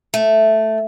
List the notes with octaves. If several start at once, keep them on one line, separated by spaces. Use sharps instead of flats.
A3